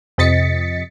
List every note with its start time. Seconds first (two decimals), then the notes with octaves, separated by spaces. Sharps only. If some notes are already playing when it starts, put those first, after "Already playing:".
0.18 F2 C3 D#5 A6 B6 C#7